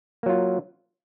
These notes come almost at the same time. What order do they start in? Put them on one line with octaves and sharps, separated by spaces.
A#3 F#3 F4